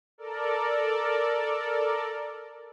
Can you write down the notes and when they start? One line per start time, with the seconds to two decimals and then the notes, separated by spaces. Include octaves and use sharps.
0.18 A4 A#4 D5